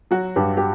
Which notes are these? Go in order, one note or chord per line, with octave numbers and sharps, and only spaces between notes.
F#3 F#4
G2 G4
G4